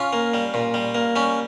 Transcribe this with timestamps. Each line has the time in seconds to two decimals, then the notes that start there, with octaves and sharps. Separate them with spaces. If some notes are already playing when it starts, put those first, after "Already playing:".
Already playing: C#4 F4
0.13 A#3
0.34 G3
0.54 A#2
0.74 G3
0.95 A#3
1.16 G3 C#4